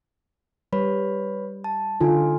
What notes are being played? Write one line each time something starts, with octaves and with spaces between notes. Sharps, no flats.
G3 B4 C#5 B5
A5
D3 D#4 F4 A4 G#5